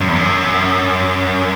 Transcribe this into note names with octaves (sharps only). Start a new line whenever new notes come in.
F#2
E2
F#2